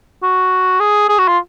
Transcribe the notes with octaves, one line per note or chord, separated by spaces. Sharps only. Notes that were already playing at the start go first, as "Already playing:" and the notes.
F#4
G#4
G#4
F#4
F4